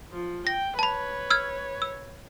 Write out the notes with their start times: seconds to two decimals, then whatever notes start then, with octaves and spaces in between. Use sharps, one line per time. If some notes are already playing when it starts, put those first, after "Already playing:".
0.12 F3
0.47 G5 A#6
0.79 B4 C#5 A5 B5
1.30 E6 F6 G#6
1.82 E6